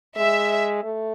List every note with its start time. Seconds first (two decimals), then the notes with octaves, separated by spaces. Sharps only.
0.17 G#3 E5
0.83 A3